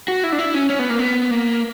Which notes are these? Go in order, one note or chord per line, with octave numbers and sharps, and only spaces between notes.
F#4
E4
D4
E4
C#4
C#4
B3
A#3
B3
A#3